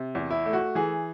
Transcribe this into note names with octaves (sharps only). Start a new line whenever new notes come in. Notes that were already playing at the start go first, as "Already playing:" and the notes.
Already playing: C3
E2
E4
A3
F#4
E3 G#4